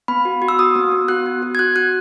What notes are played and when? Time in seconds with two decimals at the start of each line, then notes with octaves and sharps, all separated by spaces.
0.08 B3 B5
0.25 F#4
0.42 F#4
0.48 E6
0.59 F#4 D#6
0.76 B3
0.92 B3
1.08 F#4 F#6
1.26 F#4
1.42 F#4
1.55 G#6
1.59 F#4 F#6
1.76 F#4 F#6